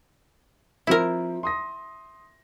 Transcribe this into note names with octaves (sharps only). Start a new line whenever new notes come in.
F3 C4 E4 A#4
C6 D#6 A#6